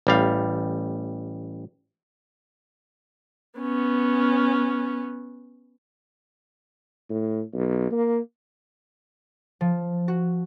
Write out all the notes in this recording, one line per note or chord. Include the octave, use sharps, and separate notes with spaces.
A1 G3 F5
B3 C#4
A2
B1
A#3
F3
F#4